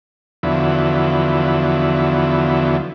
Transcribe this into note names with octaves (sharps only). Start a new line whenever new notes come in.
E2 D3 F3 F#3 B3 E4